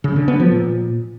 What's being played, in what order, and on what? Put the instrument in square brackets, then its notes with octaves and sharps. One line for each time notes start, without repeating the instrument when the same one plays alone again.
[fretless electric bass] C#3
D3
B3
F3
A#2